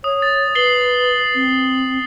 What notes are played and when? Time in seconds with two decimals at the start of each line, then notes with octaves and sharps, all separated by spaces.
0.04 C#5 D#6
0.22 A6
0.55 B4 C7 F#7 G7
1.35 C4